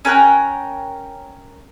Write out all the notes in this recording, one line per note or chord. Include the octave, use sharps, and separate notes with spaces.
C#4 A#4 G5 F#6